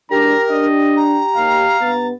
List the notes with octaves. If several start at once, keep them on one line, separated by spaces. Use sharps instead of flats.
E3 G#3 D4 G4 A#4 A#5
D4 D#5
A#5
D#2 F5
G2 B3 A6